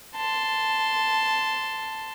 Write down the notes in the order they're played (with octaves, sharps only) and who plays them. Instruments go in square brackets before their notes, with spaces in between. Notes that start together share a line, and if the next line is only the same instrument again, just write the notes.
[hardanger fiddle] A5 C6